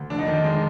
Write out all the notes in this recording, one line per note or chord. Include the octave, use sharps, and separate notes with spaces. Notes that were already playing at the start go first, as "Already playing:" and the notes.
Already playing: D2
F1 D4
D#4
D#3 D4
G#3